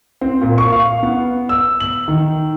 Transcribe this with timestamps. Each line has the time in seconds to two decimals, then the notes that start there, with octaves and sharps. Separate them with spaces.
0.21 C4
0.41 A#2
0.58 C#6
0.72 F5
1.03 B3
1.49 E6
1.80 F#7
2.08 D#3